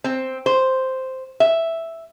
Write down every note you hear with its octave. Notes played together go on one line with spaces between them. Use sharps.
C4
C5
E5